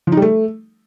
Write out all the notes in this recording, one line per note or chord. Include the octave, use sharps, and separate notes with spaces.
F3
D#4
G3
A3